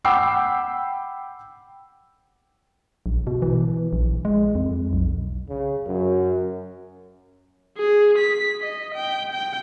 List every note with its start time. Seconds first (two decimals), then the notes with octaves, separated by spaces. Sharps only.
0.04 F#5 G5 B5 D6 E6 C7
3.06 A#1
3.27 B2
3.42 E3
3.93 A#1
4.25 G#3
4.55 F2
4.93 B1
5.49 C#3
5.87 F#2
7.77 G#4
8.18 B6
8.61 D#5
8.94 G5
9.32 G5